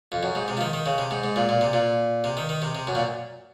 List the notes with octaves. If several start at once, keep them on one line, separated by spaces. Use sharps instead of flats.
F2
F#2
G#2
C3
F3
D#3
D#3
C#3
C3
G#2
G#2
A#2
A#2
C3
A#2
C3
D#3
D#3
C3
C3
F#2
A#2